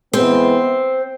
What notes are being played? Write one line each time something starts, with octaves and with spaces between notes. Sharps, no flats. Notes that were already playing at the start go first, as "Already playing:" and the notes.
E3 G#3 B3 C4